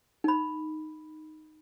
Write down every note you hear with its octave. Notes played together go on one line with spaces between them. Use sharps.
D#4 B5